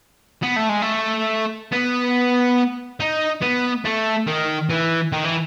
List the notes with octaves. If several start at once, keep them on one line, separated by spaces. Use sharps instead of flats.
B3
A3
G#3
A3
B3
D#4
B3
A3
D#3
E3
D#3
E3